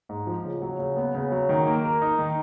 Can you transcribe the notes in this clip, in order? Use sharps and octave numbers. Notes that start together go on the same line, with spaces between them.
G#2
F3
C#3
F#3
C#3
B3
C#3
F#3
D#3
A#3
A#4
D#4
D#3